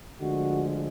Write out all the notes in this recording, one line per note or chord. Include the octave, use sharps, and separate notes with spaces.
D2 D3 F3 G#3 F#4